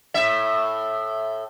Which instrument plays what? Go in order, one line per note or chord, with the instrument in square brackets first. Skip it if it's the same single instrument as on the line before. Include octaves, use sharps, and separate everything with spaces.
[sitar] A2 E5